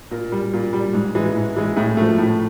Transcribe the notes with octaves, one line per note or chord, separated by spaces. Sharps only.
A#2 A#4
G3
A#2
G3
G#2
E3 G#3
G#2
E3 G#3
A2 G#4
F3 A3
A2